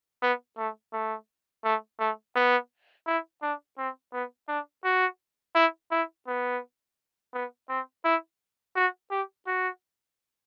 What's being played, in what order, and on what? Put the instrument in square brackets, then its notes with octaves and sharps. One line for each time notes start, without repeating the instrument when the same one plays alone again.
[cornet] B3
A3
A3
A3
A3
B3
E4
D4
C4
B3
D4
F#4
E4
E4
B3
B3
C4
E4
F#4
G4
F#4